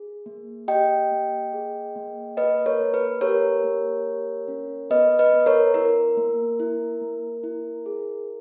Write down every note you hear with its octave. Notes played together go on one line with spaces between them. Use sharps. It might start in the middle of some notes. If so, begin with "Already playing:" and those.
Already playing: G#4
A#3
G4 D#5 G5
A#3
G#4
A#3
A#3 B4 D#5
A#4 C#5
A#3
B4
G4 A#4 C#5
A#3
G4
C#4
B3 B4 D#5
B4 D#5
B3
A#4 C#5
E4 A#4
A#3
E4
A#3
E4
G#4